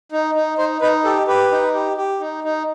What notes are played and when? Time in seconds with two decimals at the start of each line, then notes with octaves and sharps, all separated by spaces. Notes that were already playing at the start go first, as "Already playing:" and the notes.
0.12 D#4
0.35 D#4
0.58 D#4 C5
0.81 D#4 B4
1.04 G4 A4
1.27 G4 B4
1.51 D#4
1.74 G4
1.97 G4
2.20 D#4
2.44 D#4